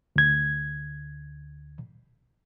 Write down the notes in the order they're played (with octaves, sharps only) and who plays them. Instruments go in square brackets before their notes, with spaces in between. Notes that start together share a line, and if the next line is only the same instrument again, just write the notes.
[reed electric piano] D2 G#6